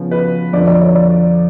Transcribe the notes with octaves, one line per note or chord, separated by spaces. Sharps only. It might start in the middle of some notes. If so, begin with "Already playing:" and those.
Already playing: C#3 F3 B3
B4
F2 D3 F3 D5
D5
C#5
D5